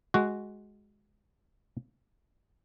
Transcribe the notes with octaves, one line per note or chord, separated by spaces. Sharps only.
G#3 F#4